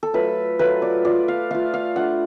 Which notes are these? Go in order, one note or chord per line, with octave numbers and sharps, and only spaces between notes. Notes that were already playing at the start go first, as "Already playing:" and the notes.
A4
F#3 A3 F4 B4
F#3 A3 F4 B4
D5
A3 F4 D5
F5
A3 F4 F5
F5
A3 D4 F4 F#5